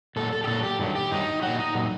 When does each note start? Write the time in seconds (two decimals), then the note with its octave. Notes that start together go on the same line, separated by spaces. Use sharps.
0.16 A#2 F#3 A4
0.32 A4
0.44 G4
0.47 A#2 F#3 A4
0.63 G4
0.79 G2 D#3 F#3
0.95 G4
1.11 G2 D#3 F#3 D#4
1.42 A#2 F#3 F#4
1.59 D#4
1.74 A#2 F#3